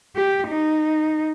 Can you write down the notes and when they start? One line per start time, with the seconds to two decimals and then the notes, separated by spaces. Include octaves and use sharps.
0.16 G4
0.48 D#4